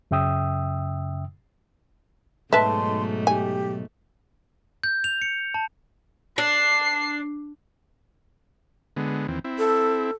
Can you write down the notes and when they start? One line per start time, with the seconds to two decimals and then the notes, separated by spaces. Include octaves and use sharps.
0.11 F#2 C#3 E5 G5 D#6 E6
2.53 B1 G#2 A3 B4 E5 A5 C6
3.27 G4 G#5
4.84 G6
5.04 F7
5.22 C#7
5.54 A5
6.38 D4 C7
8.97 D3 G#3 B3
9.28 D#2 E3 C4
9.44 C4 E4
9.58 A4